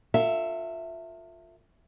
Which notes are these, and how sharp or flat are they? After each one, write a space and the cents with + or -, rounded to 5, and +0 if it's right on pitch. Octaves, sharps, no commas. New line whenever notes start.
F4 +20 A4 +40 E5 +0